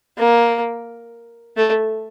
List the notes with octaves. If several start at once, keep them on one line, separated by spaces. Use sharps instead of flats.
A#3
A3